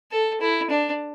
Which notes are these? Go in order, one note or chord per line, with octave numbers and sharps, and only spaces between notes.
A4
E4
D4